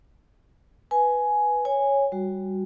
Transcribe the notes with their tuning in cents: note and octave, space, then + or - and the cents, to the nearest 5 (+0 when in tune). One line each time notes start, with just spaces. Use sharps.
B4 +0 G#5 +10
C#5 +0 G#5 -10
G3 +0 F#4 +0